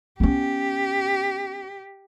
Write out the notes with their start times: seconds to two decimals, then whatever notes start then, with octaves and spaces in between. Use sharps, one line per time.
0.20 B3 C#4 G4